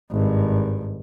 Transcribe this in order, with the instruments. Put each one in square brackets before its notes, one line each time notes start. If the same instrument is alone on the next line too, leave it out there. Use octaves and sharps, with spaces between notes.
[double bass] G#1 G2